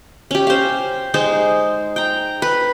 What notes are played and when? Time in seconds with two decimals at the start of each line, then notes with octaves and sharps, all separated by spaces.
0.31 C#4 G4
0.47 C5 F5
1.14 G#3 D#4 G#4 C5
1.96 G5 A#5
2.42 B4